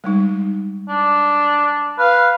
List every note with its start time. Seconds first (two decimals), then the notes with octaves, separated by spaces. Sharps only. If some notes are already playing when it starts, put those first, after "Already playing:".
0.04 G3 G#3 D#4
0.89 D4
1.99 B4 F5